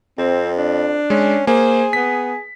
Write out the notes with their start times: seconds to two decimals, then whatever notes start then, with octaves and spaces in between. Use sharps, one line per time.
0.18 F2 C4
0.57 D4
1.10 G#3 C#4
1.47 A#3 G#4 C5
1.93 B3 B6